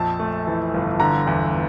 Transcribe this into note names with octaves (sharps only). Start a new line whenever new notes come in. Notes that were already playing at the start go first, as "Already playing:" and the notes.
Already playing: A#1 F2 A5
A3
E3
G1
D3 A#5
E2